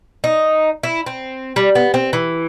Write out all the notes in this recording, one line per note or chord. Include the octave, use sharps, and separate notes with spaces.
D#4
E4
C4
G3
B3
C4
E3